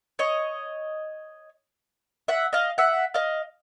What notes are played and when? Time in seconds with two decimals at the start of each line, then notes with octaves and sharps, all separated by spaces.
0.19 C#5 D#5
2.28 E5 F#5
2.53 D#5 F5
2.78 E5 F#5
3.14 D#5 F5